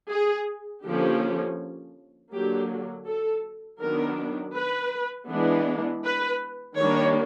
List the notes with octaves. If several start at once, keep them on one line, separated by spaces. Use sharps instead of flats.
G#4
D3 F3 A#3 C#4 G4
D3 F#3 A#3 G4
A4
D#3 F#3 B3 D4 A#4
B4
E3 G#3 B3 D4
B4
D#3 G3 A#3 D4 C#5